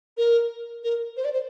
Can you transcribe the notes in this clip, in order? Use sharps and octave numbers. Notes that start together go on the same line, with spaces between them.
A#4
A#4
C5
D5
C5